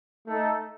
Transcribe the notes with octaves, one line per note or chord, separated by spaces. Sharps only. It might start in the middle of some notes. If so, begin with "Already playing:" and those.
A3 D#4 A4